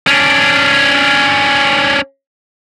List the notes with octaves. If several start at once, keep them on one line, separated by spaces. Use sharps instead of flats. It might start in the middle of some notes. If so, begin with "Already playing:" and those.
C#4 D4